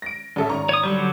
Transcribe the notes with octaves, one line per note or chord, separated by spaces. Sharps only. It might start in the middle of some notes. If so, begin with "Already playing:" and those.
A#6 D7
A1 A4 E5
G#1 A#5 C#6
C#5 D#6
D3 F#3 G3 C#5